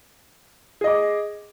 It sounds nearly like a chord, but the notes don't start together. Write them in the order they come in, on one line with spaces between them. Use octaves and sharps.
G#4 D#5 D6